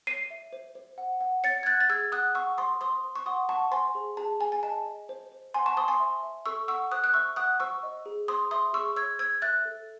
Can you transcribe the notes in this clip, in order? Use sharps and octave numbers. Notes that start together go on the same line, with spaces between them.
C#5 C7 D#7
E5
C5
C5
F#5
F#5
C#5 A6 C#7
G#6
F#5 F#6 A6
A6
G#4 E6 G#6
F#5 D#6 F#6
F#5 C#6 E6
C5 C6 D#6
C5 C6 D#6
C5
C#6
F#5 C6 D#6
F#5 A5 C#6
C5 G#5 C6
G#4
G#4 A5
G#4 G#5
G#5
D#5 A5
D#5
C5
C5
F#5 G#5 C6
A5 C#6
C5 C6 D#6
G#5 C6
E5
E5
A4 C#6 E6
F#5 C#6 E6
C5 D#6 F#6
F#6
E5 C#6 E6
F#5 D#6 F#6
C5 C#6 E6
D#5
G#4
C5 C6 D#6
E5 C6 D#6
G#4 C#6 E6
C#5 E6 G#6
C5 E6 G#6
E5 F#6 A6
A4